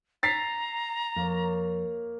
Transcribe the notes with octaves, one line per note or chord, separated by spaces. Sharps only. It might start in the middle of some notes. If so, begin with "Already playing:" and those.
A#5 A6 B6 C7
F2 A#3 C#5